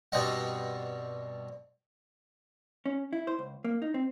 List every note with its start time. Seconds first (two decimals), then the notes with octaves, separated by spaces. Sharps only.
0.12 G2 B2 G3 C4 D#5 F#5
2.86 C#4
3.13 E4
3.27 C5
3.39 C#2
3.64 A#3
3.82 D#4
3.94 C4